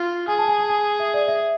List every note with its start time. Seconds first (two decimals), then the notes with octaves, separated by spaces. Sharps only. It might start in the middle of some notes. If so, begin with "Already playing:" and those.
Already playing: F4
0.28 G#4 G#5
0.38 A5
0.48 G#5
0.59 A5
0.69 G#5
1.00 E5
1.14 D5
1.28 E5